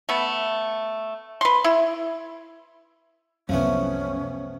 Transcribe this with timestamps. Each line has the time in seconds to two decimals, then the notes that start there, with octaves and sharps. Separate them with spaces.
0.09 A3 B3
1.41 B4 C6
1.64 E4
3.49 C2 F#2 F3 A3 B3 C#4